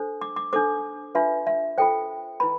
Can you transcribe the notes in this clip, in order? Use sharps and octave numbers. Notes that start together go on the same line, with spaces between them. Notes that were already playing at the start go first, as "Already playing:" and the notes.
Already playing: D4 A4 C5
D6
D6
D4 A4 C5 D6
D4 F4 B4 E5
E5
F4 A4 C5 G5
E4 B4 B5